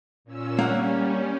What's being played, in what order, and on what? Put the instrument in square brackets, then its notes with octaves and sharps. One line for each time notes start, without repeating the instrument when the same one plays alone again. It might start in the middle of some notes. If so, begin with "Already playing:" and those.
[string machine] A#2 C#4 E6
[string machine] G3 C#4 [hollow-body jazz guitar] A#3 F#5